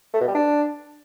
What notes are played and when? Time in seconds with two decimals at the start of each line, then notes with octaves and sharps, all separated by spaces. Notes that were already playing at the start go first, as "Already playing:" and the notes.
0.14 A3
0.21 B2
0.28 G3
0.35 D4